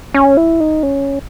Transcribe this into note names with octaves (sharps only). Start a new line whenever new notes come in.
C#4
E4
D#4
C#4